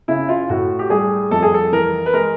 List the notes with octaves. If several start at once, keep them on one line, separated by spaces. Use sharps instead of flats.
C#3 E4
F4
A2 F#4
G4
G3 G#4
F2 A4
G#4
A4
E3 A#4
B4
G#3 A#4